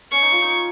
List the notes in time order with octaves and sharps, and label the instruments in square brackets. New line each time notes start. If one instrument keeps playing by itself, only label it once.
[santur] C#4 [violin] C#6
[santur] D#4
F4
D#4